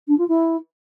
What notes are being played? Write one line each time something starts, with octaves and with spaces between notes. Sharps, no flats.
D4
F4
E4